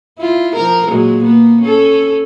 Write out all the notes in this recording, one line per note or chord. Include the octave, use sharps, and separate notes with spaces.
E4 F4
F3 A#4
A#2 F#3 G#3
A#3 B3
C#4 A4